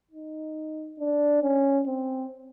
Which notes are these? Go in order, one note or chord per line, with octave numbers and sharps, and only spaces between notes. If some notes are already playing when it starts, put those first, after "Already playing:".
D#4
D4
C#4
C4